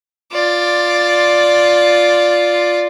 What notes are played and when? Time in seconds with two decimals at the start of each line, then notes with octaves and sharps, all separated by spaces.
0.32 F4 D5